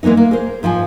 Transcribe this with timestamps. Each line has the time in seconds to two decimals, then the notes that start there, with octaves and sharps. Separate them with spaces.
0.03 E3 G#3 A#3 B3 D#4
0.17 A#3
0.31 G#4 A#4 C5
0.63 G#2 F3 G5 G#5